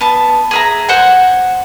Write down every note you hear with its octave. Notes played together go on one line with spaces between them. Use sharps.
B3 A5
G#4 E5 A#5
C5 F#5 G#5